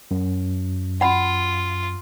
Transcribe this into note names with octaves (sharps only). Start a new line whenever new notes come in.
F#2
F4 F#5 B5